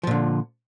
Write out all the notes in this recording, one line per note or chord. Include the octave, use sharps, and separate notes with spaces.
A#2 D3 F3